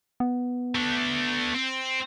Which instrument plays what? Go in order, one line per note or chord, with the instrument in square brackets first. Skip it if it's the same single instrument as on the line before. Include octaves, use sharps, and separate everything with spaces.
[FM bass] B3
[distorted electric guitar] A3 D4
C4